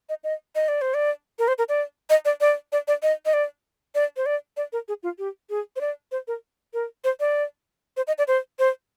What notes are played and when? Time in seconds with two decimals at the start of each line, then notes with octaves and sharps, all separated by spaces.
0.09 D#5
0.24 D#5
0.55 D#5
0.68 D5
0.81 C5
0.94 D5
1.39 A#4
1.48 C5
1.58 A#4
1.69 D5
2.10 D#5
2.25 D5
2.41 D5
2.72 D5
2.88 D5
3.03 D#5
3.26 D#5
3.33 D5
3.95 D5
4.17 C5
4.26 D5
4.57 D5
4.73 A#4
4.88 G#4
5.03 F4
5.19 G4
5.50 G#4
5.76 C5
5.81 D5
6.12 C5
6.28 A#4
6.74 A#4
7.04 C5
7.20 D5
7.97 C5
8.07 D#5
8.18 D5
8.28 C5
8.59 C5